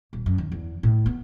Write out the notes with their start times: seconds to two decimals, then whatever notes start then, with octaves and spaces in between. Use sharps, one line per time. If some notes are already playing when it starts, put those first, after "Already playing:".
0.13 D#1
0.26 F#2
0.38 D#2
0.52 E2
0.83 A2
1.06 B3